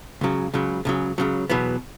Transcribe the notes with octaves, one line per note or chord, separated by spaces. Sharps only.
C#2 C#3 F#3
C#2 C#3 F#3
C#2 C#3 F#3
C#2 C#3 F#3
E2 B2 F#3 B3